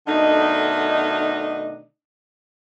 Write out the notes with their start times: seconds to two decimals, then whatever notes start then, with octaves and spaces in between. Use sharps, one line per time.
0.07 B2 D3 D#3 A3 D4 D#4